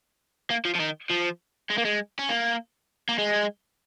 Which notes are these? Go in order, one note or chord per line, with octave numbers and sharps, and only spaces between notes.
A#3
F3
F3
D#3
F3
G#3
A#3
G#3
C#4
A#3
A#3
G#3